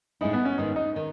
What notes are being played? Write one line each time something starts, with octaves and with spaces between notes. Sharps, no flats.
A2 G#3 C#4 D#4 E4
B3
C#4
G#2 D#3 G#3 B3 D#4
D#4
D#3